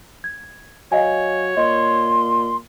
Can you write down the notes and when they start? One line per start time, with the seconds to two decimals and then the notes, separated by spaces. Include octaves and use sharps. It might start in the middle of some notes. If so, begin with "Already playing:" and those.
0.24 G#6
0.92 F#3 C#5 D#5 F5 G#5
1.57 A#2 D#5 C6